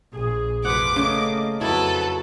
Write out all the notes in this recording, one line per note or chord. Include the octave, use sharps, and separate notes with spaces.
A#1 G#4
F1 F3 B4 F#5 D6
C#3 A3 A#3 D#5
F2 F#3 E4 A4 B4